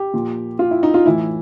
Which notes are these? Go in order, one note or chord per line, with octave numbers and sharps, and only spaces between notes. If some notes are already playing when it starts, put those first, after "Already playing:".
Already playing: G4
A#2 F3
F4
E4
D#4
F4
A2 E3 E4